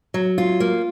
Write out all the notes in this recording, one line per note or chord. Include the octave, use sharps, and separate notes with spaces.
F#3
F4
A#3